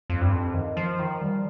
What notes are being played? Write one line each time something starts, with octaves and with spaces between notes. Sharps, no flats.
F2
G2
F2
D#3
F3
D#3
G3